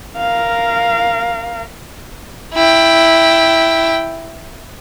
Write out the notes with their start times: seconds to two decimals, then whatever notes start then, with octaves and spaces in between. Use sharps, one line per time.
0.18 A#4 F5
2.54 E4 G5